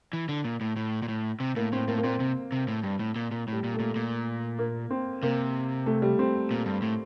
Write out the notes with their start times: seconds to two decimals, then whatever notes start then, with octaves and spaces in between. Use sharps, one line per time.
0.13 E3
0.29 D3
0.44 A#2
0.61 A2
0.76 A2
1.02 A#2
1.08 A2
1.40 C3
1.56 A2 A#3
1.73 A2 C4
1.88 A2 A#3
1.98 A#3
2.04 A#2 C4
2.20 C3
2.52 C3
2.68 A2
2.83 G2
2.99 A2
3.16 A#2
3.31 A#2
3.48 A2 G3
3.64 A#2
3.74 A3
3.80 A#2
3.96 A#2
4.59 A#3
4.91 C4
5.23 C3 A#3
5.86 A3
6.02 G3
6.19 C4
6.51 A#2
6.66 G2
6.82 A2